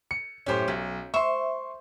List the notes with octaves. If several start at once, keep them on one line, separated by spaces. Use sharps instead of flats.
C#7
F#2 A2 C#4 G4 C5
B1 C#4
C5 E5 C6 C#6